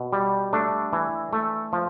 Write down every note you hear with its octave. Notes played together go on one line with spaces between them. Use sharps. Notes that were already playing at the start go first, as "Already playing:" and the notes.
Already playing: B2
G3
A3 D4
E3
A3
F3